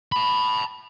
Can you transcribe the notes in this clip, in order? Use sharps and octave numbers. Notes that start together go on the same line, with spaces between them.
A5 B5